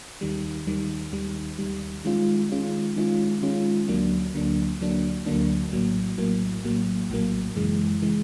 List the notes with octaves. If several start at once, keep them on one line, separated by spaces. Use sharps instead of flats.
D#2 D#3 G3
D#2 D#3 G3
D#2 D#3 G3
D#2 D#3 G3
D#3 G#3 C#4 F4
D#3 G#3 C#4 F4
D#3 G#3 C#4 F4
D#3 G#3 C#4 F4
D2 D3 F#3 A#3 D4
D2 D3 F#3 A#3 D4
D2 D3 F#3 A#3 D4
D2 D3 F#3 A#3 D4
A#1 A2 F#3 A#3
A#1 A2 F#3 A#3
A#1 A2 F#3 A#3
A#1 A2 F#3 A#3
F#2 C#3 E3 G#3
C#3 E3 G#3